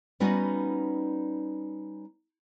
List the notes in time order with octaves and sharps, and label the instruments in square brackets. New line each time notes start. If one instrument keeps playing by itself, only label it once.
[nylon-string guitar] G3 B3 C#4 D#4 F#4